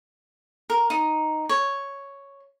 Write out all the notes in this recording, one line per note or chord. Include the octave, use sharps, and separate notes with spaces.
A#4
D#4
C#5